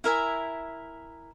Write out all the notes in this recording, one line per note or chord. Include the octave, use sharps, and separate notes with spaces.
E4 A#4 E5 G#5